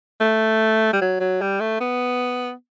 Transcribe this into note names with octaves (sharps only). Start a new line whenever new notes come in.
A3
G3
F#3
F#3
G3
A3
B3